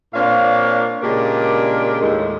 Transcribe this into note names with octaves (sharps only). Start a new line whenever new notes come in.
A#2 C4 D4 C#5 F5
A#2 C#3 G#3 D4 G4 A#4
D#2 A2 G#3